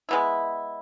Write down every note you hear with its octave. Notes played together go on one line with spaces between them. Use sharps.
G#3 B3 E4